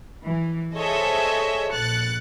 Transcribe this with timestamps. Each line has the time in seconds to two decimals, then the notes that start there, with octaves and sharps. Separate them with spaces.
0.23 E3
0.74 G#4 A4 C5 C#5 D#5 E5
1.73 A#1 F#6 A6 C#7